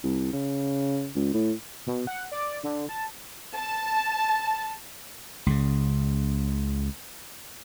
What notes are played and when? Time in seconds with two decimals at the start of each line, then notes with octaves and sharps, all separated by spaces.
0.04 C2
0.33 C#3
1.15 C#2
1.34 A2
1.87 B2
2.07 F#5
2.31 D5
2.63 D3
2.89 A5
3.55 A5
5.46 C#2 C#3